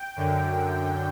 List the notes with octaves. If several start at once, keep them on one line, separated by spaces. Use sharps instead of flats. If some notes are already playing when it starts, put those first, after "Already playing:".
Already playing: G5
F#2 D3